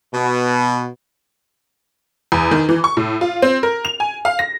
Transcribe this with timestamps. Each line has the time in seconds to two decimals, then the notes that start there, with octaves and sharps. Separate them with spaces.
0.14 B2
2.32 E2
2.51 D#3
2.69 E3
2.84 C#6
2.97 A2
3.21 F4
3.42 C4
3.63 A#4
3.85 F7
4.00 G#5
4.25 F5
4.39 A#6